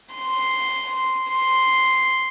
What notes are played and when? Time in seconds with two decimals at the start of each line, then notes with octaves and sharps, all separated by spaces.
0.15 C6
1.31 C6